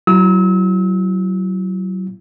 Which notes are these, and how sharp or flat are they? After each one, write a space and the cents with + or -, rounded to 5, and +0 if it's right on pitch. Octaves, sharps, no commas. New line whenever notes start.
F#3 +20 E4 +30 E6 -40